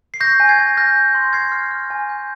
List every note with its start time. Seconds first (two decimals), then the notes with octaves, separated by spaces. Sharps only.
0.14 C7
0.20 C#6 G6 A#6
0.40 G#5
0.49 G#6 C7
0.59 G#5
0.77 F6 G6 A#6
0.96 F6
1.15 C6
1.33 F6 G#6 C7
1.52 F6
1.71 F6
1.90 G#5
2.09 G6